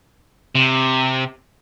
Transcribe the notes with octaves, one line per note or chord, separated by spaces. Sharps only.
C3